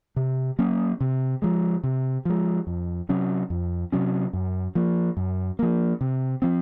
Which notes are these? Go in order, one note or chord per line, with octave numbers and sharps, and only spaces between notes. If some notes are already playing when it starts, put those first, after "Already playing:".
C3
F#3 A#3 C#4
C3
F3 G#3
C3
F3 G#3
F2
C3 F#3 C#4
F2
C3 F#3 C#4
F#2
F3 A#3
F#2
F3 A#3
C3
F3 C4